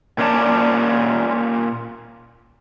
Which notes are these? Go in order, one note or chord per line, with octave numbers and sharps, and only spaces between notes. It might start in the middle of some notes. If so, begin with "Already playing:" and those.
A#2 C#4 C5 D5 A5